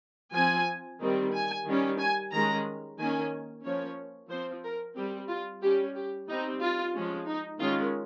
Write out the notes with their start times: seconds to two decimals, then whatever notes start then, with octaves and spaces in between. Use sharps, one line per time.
0.34 F3 C4 G#5
1.00 D#3 G3 C4
1.33 G#5
1.66 D#3 G3 C#4
1.99 G#5
2.32 D#3 G#3 C#4 A#5
2.98 D#3 A#3 C#4 G#5
3.64 F3 A#3 C#4 C#5
4.29 F3 C4 C5
4.64 A#4
4.96 G3 C4 G4
5.29 F4
5.62 G3 C#4 G4
5.95 G4
6.28 G3 C4 D#4
6.61 F4
6.93 F3 G#3 C#4
7.26 D#4
7.59 D#3 G#3 C#4 F4